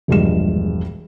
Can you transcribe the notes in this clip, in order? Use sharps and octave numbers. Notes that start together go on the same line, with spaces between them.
E1 A#1 G2 G#3 E7